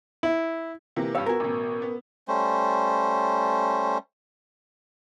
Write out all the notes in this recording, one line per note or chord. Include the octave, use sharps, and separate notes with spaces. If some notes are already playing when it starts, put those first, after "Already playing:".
E4
C3 E3 A#3
G2 G4 C#5 F5 E6
B3 F#4 A#4 G#5
A1 B2
B3
G3 A3 C#4 C5